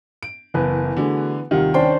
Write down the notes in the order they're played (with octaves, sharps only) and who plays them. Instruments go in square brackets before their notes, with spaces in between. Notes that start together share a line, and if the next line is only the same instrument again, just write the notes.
[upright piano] D7
[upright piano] F#1 [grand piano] E3 B3 B4
[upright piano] D3 [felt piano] A3 F#4 G#4
[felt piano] D#2 C3 G3 [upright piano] D#3 F#5 [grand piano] F4
[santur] C#4 D4 C5 [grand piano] G5